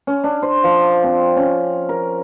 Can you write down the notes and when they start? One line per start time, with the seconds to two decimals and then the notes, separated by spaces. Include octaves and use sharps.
0.07 C#4
0.24 D4
0.42 C5
0.64 F3
1.04 C4
1.37 C#4
1.89 A#4